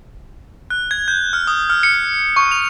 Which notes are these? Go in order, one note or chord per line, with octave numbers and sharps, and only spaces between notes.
F#6
G#6
G6
F6
D#6
F6
C#7
C#6
F7